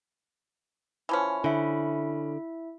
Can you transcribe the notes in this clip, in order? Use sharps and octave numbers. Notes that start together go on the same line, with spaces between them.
E3 F3 C#4
D3 E4 E5